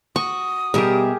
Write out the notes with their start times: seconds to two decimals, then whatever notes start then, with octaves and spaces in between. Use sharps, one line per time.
0.16 F#4 C#6 D#6
0.74 B2 G3 G4 G#4 A#4 E5